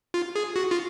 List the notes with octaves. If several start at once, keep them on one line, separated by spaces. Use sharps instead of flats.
F4
G#4
F#4
F4